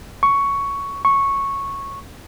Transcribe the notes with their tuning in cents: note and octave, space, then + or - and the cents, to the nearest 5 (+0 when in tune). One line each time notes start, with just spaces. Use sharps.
C#6 +10
C#6 -5